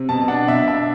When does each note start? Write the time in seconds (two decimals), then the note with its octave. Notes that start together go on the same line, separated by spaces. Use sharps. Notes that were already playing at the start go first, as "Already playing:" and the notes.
Already playing: C3
0.09 B2 A5
0.28 D4 F#5
0.48 B2 E5
0.68 D4 E5